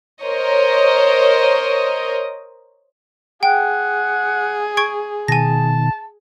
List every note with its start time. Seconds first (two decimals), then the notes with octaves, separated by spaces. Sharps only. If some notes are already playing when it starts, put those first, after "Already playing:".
0.22 A#4 C5 C#5 D#5
3.43 G#4 F#5 G5
4.77 C#6 G#6 D7
5.28 B2 D#3 G#5 A5 A#6